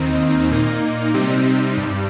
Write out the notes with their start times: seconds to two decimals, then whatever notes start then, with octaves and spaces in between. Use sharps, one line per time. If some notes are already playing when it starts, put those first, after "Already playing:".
Already playing: D#2 D#3 C4 D#4
0.51 A#2 A#3 D#4
1.14 C3 G3 C4 D#4
1.77 G2 G3